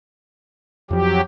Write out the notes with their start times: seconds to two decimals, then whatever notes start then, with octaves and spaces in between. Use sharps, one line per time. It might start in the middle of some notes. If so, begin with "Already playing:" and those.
0.91 F2 F3 F#3 G4